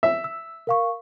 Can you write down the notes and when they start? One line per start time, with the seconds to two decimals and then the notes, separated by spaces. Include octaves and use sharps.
0.03 E5
0.24 E6
0.67 A#4 F5 C#6